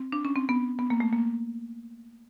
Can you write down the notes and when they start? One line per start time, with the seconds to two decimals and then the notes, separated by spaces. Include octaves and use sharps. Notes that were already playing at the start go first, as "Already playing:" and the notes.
Already playing: C4
0.12 D4
0.25 C#4
0.36 C4
0.49 B3
0.79 B3
0.90 A#3
1.00 A3
1.13 A#3